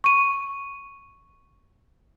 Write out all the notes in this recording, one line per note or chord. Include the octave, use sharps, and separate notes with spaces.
C#6 D#7